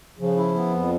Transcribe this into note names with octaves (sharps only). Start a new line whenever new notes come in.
C#3 F3
E4
B3
F2